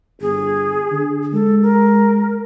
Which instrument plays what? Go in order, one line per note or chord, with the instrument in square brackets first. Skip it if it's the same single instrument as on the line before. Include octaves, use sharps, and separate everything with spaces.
[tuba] G1 [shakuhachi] G#4
[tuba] D3
[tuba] G#3 [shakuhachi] A4
[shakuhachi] A#4